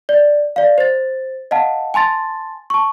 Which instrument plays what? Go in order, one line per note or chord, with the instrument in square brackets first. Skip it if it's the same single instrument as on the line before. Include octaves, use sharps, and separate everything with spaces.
[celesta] D5
D5 F5
C5 A6
D#5 F5 F#5 A5
G#5 A5 C6 A6
A5 C#6